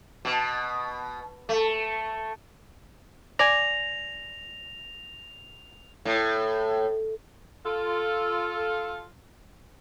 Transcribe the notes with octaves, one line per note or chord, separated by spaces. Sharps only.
B2
A3
D5 G#5 A#6 F7
A2
F4 A4